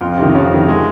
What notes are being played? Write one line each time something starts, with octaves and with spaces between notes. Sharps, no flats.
F2 F4
C3 D#3
F2 C#4
C3 D#3
G#3